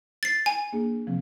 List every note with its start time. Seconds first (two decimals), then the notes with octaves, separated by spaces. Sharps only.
0.23 A6 C7
0.46 G#5
0.73 A#3 D4 G#4
1.07 C3 F3 C4